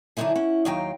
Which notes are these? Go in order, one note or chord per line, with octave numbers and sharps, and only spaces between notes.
D3 E3 F#3 D#4 E4 G#4
C#4 E4 F#5
D#2 D#3 F#3 D#4 F5 G5